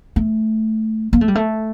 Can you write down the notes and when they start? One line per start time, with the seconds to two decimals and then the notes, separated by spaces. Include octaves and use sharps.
0.16 A3
1.13 A#3
1.21 A3
1.28 G3
1.35 A3